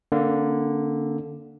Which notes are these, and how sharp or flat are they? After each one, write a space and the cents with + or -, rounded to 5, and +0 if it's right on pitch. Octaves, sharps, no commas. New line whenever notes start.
D3 +0 A#3 -5 C#4 -35